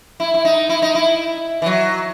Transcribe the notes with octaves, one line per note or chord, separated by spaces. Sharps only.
E4
E4
D#4
E4
D#4
E4
E3
F#3